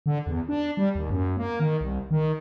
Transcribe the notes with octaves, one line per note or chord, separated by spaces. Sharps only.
D3
E2
D4
G3
D#2
F#2
A#3
D#3
C2
D#3